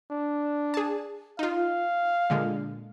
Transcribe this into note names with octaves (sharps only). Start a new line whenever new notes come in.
D4
G#4 A5
D#4 F4 F5
A#2 D3 G#3